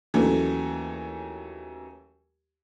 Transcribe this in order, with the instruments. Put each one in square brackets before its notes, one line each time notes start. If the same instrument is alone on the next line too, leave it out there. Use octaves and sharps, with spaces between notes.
[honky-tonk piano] D#2 E3 F#3 A3 C#4